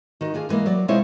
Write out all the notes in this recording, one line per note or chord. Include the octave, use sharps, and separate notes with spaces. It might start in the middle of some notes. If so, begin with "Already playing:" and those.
D#3 F#4
D4 F4 G#4 F5
D3 E3 G#3 A#3
F#3 D5
B2 G#3 C4 E4 F4 C#5